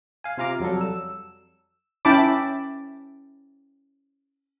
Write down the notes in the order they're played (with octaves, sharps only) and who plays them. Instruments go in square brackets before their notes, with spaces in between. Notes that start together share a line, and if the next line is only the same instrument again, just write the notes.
[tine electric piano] F5 G#5
C3 F4 F5 A#5 D6
F2 F#3 G3 A4
E6
[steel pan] C#4 E4 G5 A5 B5 D6